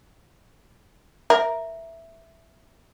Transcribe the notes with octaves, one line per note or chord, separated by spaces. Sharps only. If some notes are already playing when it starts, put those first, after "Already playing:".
A#4 E5